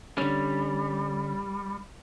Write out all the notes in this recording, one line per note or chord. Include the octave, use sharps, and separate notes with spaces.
D3 G3 C#4